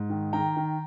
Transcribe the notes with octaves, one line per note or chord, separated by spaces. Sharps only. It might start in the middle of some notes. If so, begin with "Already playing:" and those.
Already playing: G#2
D#3
D#3 G5 A#5
D#3